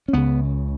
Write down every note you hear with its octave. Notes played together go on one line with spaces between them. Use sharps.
C#4
C#2 C#3 B3